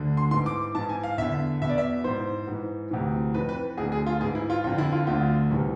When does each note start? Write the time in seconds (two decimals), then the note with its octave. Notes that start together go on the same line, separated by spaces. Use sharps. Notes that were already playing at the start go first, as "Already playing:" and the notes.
Already playing: D2 D3
0.17 C6
0.31 G#2 E3 C6
0.46 D6
0.75 G#2 E3 A5
0.89 G#5
1.03 F5
1.18 E2 D3 E5
1.62 E2 B2 E5
1.69 D5
1.78 E5
2.04 G#2 E3 C5
2.47 G#2 E3
2.91 D2 C3 E3
3.34 F2 E3 B4
3.49 B4
3.77 D2 G#4
3.81 D3
3.92 G#4
4.07 F4
4.21 G#2 E3 G#4
4.35 E4
4.50 F4
4.64 F2 F4
4.67 D3
4.78 E4
4.92 F4
5.07 D2 D3 F4
5.51 C2 C3 E3